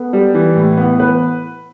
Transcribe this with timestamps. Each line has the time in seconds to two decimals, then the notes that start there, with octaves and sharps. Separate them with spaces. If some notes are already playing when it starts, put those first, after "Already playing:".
Already playing: B3 A4
0.13 G3
0.34 E3
0.56 A2
0.77 B3
1.00 E3 B4